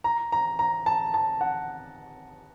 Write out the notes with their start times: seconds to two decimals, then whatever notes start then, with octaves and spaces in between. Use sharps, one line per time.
0.04 A#5
0.32 A#5
0.59 A#5
0.86 A5
1.14 A5
1.41 F#5